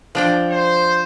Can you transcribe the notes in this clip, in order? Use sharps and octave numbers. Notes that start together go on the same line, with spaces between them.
F3 D4 G5
C5